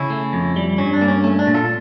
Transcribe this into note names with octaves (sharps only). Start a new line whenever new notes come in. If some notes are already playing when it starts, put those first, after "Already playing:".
Already playing: C#3 C#4 E4
A3
F2
G3
G2 C#4
D4
A#3
C#4
A3 C#4
D4
A#2
F4 A4